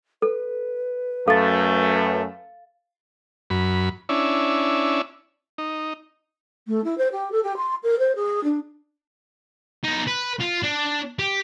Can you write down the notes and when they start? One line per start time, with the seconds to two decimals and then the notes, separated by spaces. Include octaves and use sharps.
0.22 A4 B4
1.28 F#2 A3 A4 F5 A6
3.50 F#2 B5
4.09 C#4 D4 E4
5.58 D#4
6.67 A3
6.83 E4
6.97 C5
7.11 G4
7.31 A4
7.43 G4
7.56 C6
7.83 A#4
7.98 C5
8.15 G#4
8.43 D4
9.84 B3 D#4
10.07 B4
10.40 F4
10.63 D4
11.19 G4